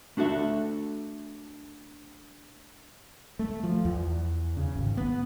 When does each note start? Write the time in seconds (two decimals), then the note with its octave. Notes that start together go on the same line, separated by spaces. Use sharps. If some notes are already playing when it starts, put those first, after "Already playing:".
0.17 A3 D4 F#4 A4 E5
3.39 A3
3.63 F3
3.85 E2
4.57 C#3
4.75 G#1
4.97 B3